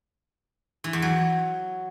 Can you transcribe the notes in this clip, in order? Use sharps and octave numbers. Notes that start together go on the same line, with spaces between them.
E3
E2
F#3